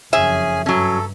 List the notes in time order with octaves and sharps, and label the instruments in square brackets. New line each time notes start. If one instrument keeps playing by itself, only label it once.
[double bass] F#1 F2 [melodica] C#4 G#4 G#5 [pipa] E5
[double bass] G2 [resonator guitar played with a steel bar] F#3 C#4 [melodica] A4